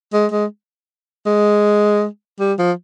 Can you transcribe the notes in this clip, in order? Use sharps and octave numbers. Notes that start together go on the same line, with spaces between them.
G#3
G#3
G#3
G3
F3